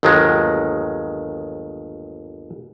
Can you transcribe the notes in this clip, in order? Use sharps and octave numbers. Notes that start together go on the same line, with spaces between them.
G1 D#2 D#3 F#3 G#3